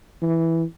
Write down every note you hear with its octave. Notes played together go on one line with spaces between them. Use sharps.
E3